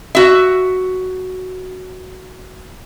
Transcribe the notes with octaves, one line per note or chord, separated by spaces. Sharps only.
F#4 E5